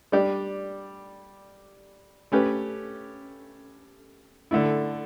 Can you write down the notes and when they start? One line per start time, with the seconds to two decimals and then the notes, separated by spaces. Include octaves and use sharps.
0.12 G3 D4 G4
2.32 A3 C#4 G4 B4
4.51 D3 A3 E4